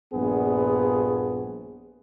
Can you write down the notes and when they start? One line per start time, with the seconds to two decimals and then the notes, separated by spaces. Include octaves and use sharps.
0.14 A#1 G2 B3 G#4